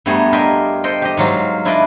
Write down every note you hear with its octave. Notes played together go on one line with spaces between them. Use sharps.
G2 G3 A3 B3 G#4 A#5
D4 F4 G4 A#4 D#5 E5
A4 C5 D#5 G5
G4 D#5
G#2 F#3 F4
D4 E4 F4 B4 D5 D#5